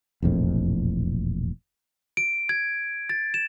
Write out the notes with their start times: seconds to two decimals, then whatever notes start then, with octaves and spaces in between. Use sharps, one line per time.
0.22 E1 A#1 F2 A2
2.17 D7
2.49 G#6
3.09 A6
3.34 E7